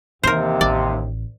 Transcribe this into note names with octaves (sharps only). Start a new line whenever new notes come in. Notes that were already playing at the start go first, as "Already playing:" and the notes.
D#2 C3 E3 A#4 C5
A1 D5